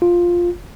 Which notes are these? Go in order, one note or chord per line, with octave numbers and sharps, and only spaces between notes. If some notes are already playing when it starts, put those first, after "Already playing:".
F4